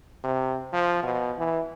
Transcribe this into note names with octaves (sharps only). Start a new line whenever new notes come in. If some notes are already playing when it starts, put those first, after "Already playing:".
C3
F3
B2
E3